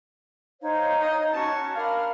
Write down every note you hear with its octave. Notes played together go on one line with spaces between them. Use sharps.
D#4 C5 C#5 F5
D#5
C#4 F#4 A5 C#6
D4 A#4 F5 B5 F6